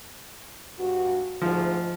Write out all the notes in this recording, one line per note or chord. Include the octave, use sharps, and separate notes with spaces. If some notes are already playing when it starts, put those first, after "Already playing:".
G2 F#4
D2 G#2 F3